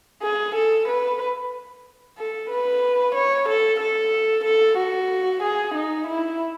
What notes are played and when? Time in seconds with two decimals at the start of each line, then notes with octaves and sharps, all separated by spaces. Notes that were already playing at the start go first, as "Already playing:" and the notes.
0.22 G#4
0.55 A4
0.88 B4
2.18 A4
2.51 B4
3.15 C#5
3.48 A4
3.80 A4
4.44 A4
4.78 F#4
5.43 G#4
5.74 D#4
6.07 E4